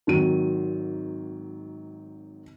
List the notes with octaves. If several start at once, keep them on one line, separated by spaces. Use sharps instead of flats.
G#1 D#3 F#3 D#7